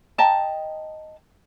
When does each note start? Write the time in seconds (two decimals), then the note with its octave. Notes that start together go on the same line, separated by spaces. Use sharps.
0.18 D#5 G5 A5 A#5